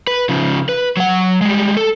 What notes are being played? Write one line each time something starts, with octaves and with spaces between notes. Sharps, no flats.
B4
C#3 F3
B4
F#3 F#5
G3 G#3
A4